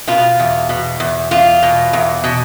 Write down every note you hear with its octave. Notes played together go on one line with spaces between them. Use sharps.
B2 F4
E2
B2
E2
E2 F4
B2
E2
B2